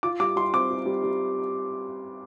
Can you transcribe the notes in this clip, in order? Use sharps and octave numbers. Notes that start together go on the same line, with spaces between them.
F4 D6
G3 D6
G3 C6
C4 D6
F4
G3
G3